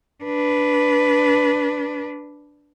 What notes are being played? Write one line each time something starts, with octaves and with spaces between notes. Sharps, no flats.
D4 B4